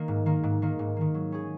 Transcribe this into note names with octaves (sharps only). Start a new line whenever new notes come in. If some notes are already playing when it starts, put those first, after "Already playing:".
Already playing: D#3 A#3
G#2
D#3 A#3
G#2
D#3 A#3
G#2
D#3 A#3
F#3
C#4 G#4